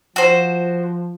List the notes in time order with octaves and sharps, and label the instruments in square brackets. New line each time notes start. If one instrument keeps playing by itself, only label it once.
[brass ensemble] F3 [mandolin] F#4 C5